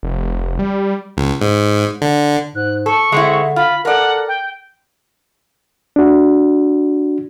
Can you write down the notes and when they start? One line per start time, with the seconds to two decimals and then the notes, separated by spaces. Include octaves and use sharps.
0.03 F1
0.59 G3
1.17 C#2
1.41 G#2
2.02 D3
2.56 G#2 F#6
2.86 A4 C#6
3.12 D3 G#3 C4 E4
3.56 F4 B5
3.85 A4 A#4 D5 F#5
4.28 G5
5.96 D4 F#4